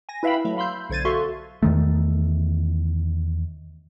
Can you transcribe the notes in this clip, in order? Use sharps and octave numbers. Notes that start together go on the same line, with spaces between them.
G#5 A#6
E4 B4 E5 F5 G5 B5
F#3 A3
F5 B5 C6 E6 G6
B1 D3 C5 G#6 A6 D#7
F#4 A4 E5 F5 C6 C#6
E2 D#3 A3